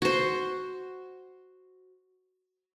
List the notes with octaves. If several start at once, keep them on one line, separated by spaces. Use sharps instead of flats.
F#4 C5